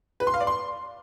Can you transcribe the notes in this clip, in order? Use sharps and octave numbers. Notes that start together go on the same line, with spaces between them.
B4
C6
F5
D5
C6